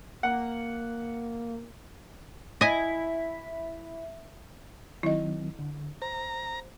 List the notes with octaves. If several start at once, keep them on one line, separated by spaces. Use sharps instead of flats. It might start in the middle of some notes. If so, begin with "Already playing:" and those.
A#3 F#5
E4 D#5 G#5
D#3 F#3 C4 E4 D#5
D3
C5 A#5